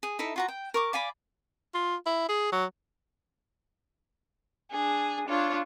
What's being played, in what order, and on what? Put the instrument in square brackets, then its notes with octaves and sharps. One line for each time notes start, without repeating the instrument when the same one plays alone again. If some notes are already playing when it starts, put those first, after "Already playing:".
[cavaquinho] G#4
D#4 E4 A4 E5
F4 F#4 A#5
G5
A#4 C#6 D6
D5 F5 G#5 B5
[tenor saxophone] F4
E4
G#4
F#3
[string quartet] D4 G#4
D4 F4 C#5